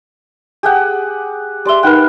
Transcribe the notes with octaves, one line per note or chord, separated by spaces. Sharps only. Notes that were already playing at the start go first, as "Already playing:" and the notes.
G4 G#4 F#5
G4 D5 E5 C6 G7
D#4 A#4 B4 F#5 G5 F#6